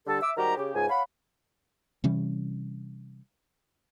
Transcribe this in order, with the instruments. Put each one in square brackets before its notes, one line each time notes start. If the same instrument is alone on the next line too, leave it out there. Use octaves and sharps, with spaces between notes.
[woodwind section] D3 G3 A4
E5 D6 E6
G#2 D#3 G3 F#4 G4 A#5
C#3 G4
C#2 G#2 G#5
C#5 F5 F#5 B5
[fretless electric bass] C3 E3 G3 C#4